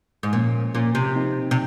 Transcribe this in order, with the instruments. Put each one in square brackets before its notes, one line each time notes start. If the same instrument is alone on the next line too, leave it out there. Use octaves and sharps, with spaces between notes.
[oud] G#2
[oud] A#2 [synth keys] F3 A#3 C#4
[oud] A#2 [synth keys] F3 A#3 C#4
[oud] C3
[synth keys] F3 C4 D#4
[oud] C3